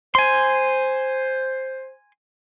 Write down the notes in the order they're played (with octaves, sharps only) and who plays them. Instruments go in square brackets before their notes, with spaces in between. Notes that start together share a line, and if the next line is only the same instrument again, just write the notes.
[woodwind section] C5 [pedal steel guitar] G#5 C6